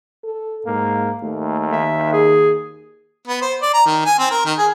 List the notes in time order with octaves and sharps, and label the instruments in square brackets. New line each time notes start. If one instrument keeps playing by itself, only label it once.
[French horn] A4
[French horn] G#2 [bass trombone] A#3
[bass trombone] D#2 [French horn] A3
[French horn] D#3 [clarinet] E5
[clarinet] G#4
[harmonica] B3
C5
D5
A#5
D#3
G#5
C4
A#4
D#3
G#4